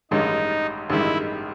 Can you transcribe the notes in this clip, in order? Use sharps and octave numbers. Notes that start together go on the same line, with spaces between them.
A1 G2 D#3 G#3 D#4
A1 G2 D#3 G#3 E4